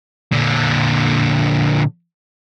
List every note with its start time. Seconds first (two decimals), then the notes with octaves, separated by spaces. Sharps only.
0.32 A#2 D3